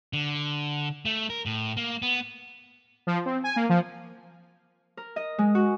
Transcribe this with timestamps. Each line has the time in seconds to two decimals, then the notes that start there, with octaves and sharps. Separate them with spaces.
0.13 D3
1.05 A3
1.30 A#4
1.46 A2
1.77 A#3
2.02 B3
3.07 F3
3.25 C4
3.44 G#5
3.56 A#3
3.69 F3
4.97 A#4
5.16 D#5
5.38 G#3
5.55 F#4